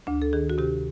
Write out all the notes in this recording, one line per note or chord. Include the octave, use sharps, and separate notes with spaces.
D2 D4
A4
D#3 G#4
F#4
C3 G4